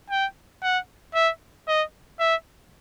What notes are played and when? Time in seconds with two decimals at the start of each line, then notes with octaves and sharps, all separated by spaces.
0.10 G5
0.63 F#5
1.15 E5
1.68 D#5
2.19 E5